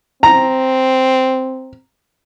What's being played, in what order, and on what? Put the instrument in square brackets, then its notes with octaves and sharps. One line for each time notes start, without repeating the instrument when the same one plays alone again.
[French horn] C4 [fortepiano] A#5